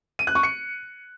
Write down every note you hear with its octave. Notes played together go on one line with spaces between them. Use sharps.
D#7
F#6
C#6
C#7